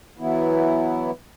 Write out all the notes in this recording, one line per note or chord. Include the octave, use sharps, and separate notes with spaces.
E3 F#3 B3 E4